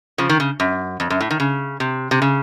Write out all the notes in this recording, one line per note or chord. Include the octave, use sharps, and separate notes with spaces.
C#3 F3
D#3
C#3
F#2
F2
F#2
A2
D#3
C#3
C3
C3
C#3